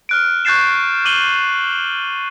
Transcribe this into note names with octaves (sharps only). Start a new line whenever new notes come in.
F6 F#6 D7
C#6 F#6 G6 A6 C7 E7
D6 D#7 F#7 G7